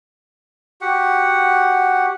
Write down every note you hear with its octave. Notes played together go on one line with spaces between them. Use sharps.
F#4 G4 F#5